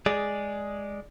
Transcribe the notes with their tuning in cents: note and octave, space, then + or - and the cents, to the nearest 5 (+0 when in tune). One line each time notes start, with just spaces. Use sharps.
G#3 +0 G#4 +0 D5 +0